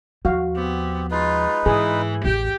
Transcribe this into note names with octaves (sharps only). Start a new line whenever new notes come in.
D#2 F3 F#4 F5
B3 C4 G4
G#3 D#4 F4 B4
G#2 E3 G#4
A1 E2 G4 G5